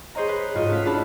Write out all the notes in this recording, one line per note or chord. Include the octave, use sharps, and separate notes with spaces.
G#4 C5 C#5 D#5 A#5
B4
G#2 F4 F#4 C#5 D#5
A3 C#4 F5 B6
D4 E4 F#4 C#5 A5 B5